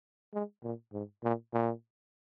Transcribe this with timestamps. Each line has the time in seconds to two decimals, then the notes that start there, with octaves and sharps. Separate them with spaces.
0.34 G#3
0.63 A#2
0.93 G#2
1.24 A#2
1.53 A#2